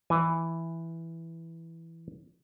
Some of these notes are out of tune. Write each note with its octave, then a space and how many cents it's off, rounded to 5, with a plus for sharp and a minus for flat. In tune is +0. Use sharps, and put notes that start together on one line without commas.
E3 +0 G#5 +0